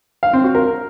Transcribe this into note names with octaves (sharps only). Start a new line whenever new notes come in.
F5
C4
F#4
A#4